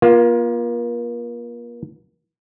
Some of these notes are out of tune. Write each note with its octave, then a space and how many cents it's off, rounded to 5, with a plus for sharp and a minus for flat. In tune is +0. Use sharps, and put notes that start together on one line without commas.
A#3 +35 F4 +0